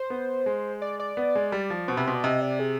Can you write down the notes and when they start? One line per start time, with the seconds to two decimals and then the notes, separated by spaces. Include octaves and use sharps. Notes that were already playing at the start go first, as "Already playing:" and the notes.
Already playing: C5
0.10 B3
0.46 G#3
0.82 D5
1.00 D5
1.17 B3
1.35 G#3
1.52 G3
1.70 F3
1.88 B2 C5
1.97 C3 B4
2.06 B2 C5
2.15 D5
2.24 C3 D#5
2.42 D5
2.59 G#4